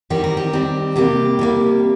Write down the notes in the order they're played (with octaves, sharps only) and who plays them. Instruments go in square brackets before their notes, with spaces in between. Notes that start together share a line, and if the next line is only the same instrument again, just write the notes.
[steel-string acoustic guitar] D#3 G3 C4 G4
A#4
G4
D#3 G3 C4
C3 G3 A#3 G4
C3 G3 A#3